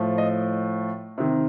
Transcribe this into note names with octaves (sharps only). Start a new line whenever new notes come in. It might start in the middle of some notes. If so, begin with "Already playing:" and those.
Already playing: A2 F3
D#5
C3 D#3